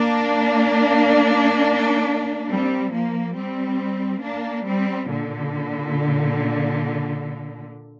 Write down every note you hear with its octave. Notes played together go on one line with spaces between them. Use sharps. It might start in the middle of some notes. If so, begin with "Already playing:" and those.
Already playing: A#3 D4
G3 C4
F3 A#3
G3 C4
A#3 D4
G3 C4
A#2 D3